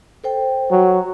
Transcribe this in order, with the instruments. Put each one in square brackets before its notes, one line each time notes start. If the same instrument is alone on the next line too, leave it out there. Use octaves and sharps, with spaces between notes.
[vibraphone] A4 C5 G5
[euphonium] F#3